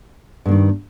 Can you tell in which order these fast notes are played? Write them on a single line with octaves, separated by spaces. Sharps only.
G2 A#3 D#3